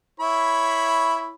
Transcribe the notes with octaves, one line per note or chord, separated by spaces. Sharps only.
E4 C#5 B5